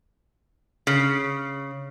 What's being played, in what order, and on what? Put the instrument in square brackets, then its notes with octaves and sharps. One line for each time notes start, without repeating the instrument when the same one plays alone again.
[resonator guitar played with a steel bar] C#3